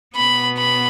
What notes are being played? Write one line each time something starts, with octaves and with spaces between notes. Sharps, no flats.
B2 B3 B5
B5